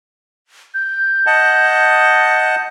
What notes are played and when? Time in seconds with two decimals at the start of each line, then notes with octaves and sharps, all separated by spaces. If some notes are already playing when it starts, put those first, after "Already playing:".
0.74 G6
1.27 D#5 F#5 A5